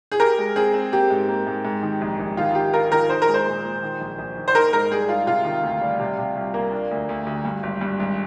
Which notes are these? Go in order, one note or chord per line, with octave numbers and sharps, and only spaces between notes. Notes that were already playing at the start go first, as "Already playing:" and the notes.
G#4
G4 A#4
G#3
C4 G#4
C4
A#3 G4
G#2
A#3
G#2
G#2
D#3
A#1
A#1
D#3 F4
D#3 G4
F4 A#4
D#3 A#4
D#4 C5
A#4
G#3
C5
A#2
A#2
D#3
A#1
A#1
D#3
C5
D#4 A#4
G#2 A#4
G3 G#4
D#4 F4
C3 F4
D#3
D2
G3
C3
C3
C2
A#3
D4
D2
D2
D2
G2
G#1
G2
G#1